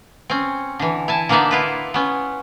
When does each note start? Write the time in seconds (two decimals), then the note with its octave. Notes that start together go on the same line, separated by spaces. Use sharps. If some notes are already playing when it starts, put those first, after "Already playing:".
0.30 C4 C#4
0.79 D3 E3
1.08 E4 G#5 A5
1.29 D3 A#3 B3 D#4 D5 E5
1.51 E4 F4 B4
1.94 B3 C#4